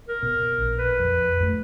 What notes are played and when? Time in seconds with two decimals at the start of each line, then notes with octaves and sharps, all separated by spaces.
0.08 A#4
0.23 B2
0.58 A#1
0.79 B4
0.99 F2
1.40 F#2 A3